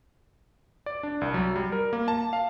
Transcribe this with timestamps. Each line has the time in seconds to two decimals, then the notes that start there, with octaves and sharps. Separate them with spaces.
0.86 D5
1.03 D4
1.21 C2
1.34 F#3
1.56 G3
1.72 A#4
1.93 A#3
2.08 A5
2.33 F5